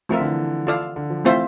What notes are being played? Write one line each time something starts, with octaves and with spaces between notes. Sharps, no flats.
F3 A3 C4 F4 A#4 E5
D3
E3
F4 A4 D5 F5
D3
F3
E3 A3 C4 F4 C5 E5